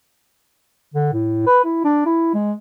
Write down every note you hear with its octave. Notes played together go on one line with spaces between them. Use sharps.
D3
A2
B4
E4
D4
E4
G#3